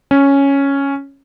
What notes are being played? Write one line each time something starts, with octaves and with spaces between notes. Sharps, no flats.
C#4